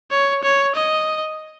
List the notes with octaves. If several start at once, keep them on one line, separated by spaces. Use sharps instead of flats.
C#5
C#5
D#5